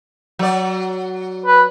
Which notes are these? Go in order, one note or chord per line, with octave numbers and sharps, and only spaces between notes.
F#3 D5
B4